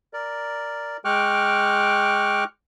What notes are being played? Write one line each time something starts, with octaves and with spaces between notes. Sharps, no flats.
A#4 D5
G#3 G5 C#6 D6 F6 F#6